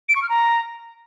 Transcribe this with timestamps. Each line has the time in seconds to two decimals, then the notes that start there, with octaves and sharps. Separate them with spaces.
0.09 D7
0.16 C#6
0.22 F6
0.29 A#5